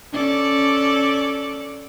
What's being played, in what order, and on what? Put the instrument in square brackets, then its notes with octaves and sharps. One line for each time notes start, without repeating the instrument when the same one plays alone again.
[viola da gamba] C#4 A4 D5